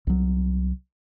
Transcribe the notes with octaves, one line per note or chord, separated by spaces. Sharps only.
C2 F#3